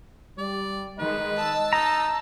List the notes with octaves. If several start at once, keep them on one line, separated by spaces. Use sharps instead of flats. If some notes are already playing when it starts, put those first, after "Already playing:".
G3 D5
D#3 G#3 B4 D#5
A5 E6
D#4 A#5